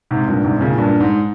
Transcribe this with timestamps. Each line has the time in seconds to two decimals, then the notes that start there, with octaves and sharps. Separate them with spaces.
0.11 G#2 C3
0.28 G2 A#2
0.44 G#2 C3
0.57 C3
0.61 A#2 C#3
0.78 G2 A#2
1.00 G#2